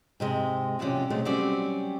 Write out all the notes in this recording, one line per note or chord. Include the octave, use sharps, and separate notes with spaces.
G#2 C3 G#3
E2 C3 F3 F#3 C#4 D5
C3 F#3 G#3 A3
F#3 G3 C4 C#4 G4 D5